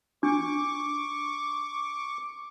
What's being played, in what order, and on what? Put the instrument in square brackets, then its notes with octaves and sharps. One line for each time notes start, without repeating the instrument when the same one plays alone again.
[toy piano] D4 [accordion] C#6 D6